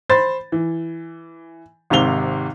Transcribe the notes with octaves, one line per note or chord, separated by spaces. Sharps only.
C5 B5 A6
E3
G#1 G#2 C3 F5 F7 G7